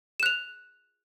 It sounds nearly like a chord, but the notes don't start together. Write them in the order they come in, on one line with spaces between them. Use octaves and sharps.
E7 F#6 F7